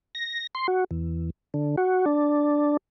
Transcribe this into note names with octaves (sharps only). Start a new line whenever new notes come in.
A#6
C6
F#4
E2
D3
F#4
D4